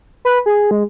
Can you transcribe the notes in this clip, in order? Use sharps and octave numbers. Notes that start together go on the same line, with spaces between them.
B4
G#4
G#3